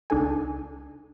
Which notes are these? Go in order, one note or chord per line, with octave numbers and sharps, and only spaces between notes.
C#2 D4 D#4 A4 G#5